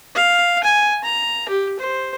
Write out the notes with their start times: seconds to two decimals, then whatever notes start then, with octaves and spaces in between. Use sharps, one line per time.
0.15 F5
0.64 G#5
1.04 A#5
1.49 G4
1.79 C5